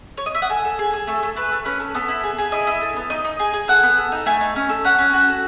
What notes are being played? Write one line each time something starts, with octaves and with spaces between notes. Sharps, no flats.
C#5
D#5
E5
F#5
A4 G#5
A4
G#4
G#4
A3 A4
A3
A3 B4
A3
C#4 B4
A4
B3 A4
E4
G#4
G#4
E4 D#5
E4
A4
B3
D#4 D#5
D#4
G#4
G#4
A4 F#5
B3
A4
D#4
A3 G#5
D#4
C#4
A4
C#4 F#5
C#4
F#4
A4